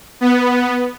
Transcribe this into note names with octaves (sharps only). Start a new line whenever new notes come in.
B3